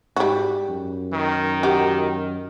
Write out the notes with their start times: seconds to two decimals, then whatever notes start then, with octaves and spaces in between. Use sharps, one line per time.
0.16 G#2 G3 F#4
0.69 F#2
1.13 D#3
1.63 F#4 G4